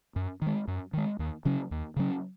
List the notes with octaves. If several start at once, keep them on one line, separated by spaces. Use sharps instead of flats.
F#2
D#3 G#3
F#2
D#3 G#3
D#2
C#3 F#3 C#4
D#2
C#3 F#3 C#4